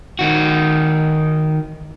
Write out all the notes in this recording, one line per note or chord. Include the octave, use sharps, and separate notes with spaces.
D#3 F#4